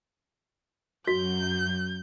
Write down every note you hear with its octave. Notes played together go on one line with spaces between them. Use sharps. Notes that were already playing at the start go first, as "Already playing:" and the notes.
F#2 F#3 F#4 G6